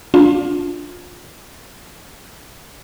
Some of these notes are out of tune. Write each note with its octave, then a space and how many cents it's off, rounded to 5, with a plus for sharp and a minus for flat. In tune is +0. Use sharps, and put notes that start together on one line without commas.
D4 -10 F4 +20